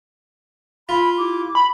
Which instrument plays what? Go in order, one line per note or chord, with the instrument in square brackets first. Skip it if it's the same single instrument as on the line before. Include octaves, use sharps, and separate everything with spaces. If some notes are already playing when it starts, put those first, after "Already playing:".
[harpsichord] F4 [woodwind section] B5
[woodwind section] E4 G4 D6
[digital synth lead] B5